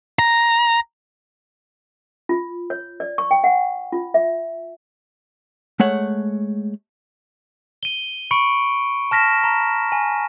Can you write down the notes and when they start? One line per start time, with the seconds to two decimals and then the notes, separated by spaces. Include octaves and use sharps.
0.19 A#5
2.29 F4
2.70 C#5
3.00 D5
3.18 C#6
3.31 G5
3.44 F#5
3.92 F4
4.14 E5
5.80 G#3 A3 C#5 F#5
7.83 D#7 G7
8.31 B5 C#6 C#7 D7
9.11 A5 F6 A#6 B6 E7
9.44 A#5
9.92 G#5